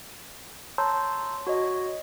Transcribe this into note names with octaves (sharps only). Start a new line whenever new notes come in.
C#5 A5 A#5 C6 E6 G6
F#4 C#5 D#5